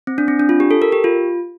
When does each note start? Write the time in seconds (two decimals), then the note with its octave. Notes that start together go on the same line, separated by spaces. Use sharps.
0.07 C4
0.18 D4
0.28 C4
0.40 D4
0.49 F4
0.60 G4
0.71 A4
0.82 A#4
0.92 G4
1.04 F4